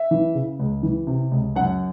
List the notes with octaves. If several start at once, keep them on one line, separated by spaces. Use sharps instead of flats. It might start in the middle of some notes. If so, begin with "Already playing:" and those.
Already playing: E5
E3
C#3
C#2
E3
C3
C#2
F#2 F#5